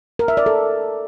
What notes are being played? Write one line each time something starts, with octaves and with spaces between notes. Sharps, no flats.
A#4
E5
D5
A4